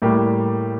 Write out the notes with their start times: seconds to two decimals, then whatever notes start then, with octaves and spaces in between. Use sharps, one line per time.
0.02 A2 G3 A#3 G4